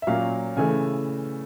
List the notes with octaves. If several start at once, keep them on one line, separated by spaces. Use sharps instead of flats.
E5
A#2 F#3 A#3 C#4 F5
C#3 E3 A3 G#5